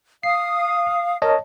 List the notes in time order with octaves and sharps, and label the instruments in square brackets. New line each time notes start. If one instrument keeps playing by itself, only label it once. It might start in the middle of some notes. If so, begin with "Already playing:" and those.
[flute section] F5 D#6 [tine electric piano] C7
[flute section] A#4 [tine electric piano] C#5 D#5 A5